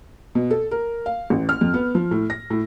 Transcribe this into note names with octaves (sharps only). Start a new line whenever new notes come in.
B2
A4
A#4
F5
A1
F6
F2
B3
F3
A2
A#6
A2